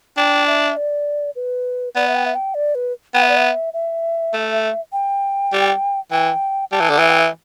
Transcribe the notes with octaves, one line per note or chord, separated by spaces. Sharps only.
D4 G5
E5
D5
B4
B3 D5
E5
G5
E5
G5
D5
B4
B3 G5
E5
D5
E5
E5
A3
G5
G3
E3 G5
G3 A5
E3
D3
E3 E5
G5
E5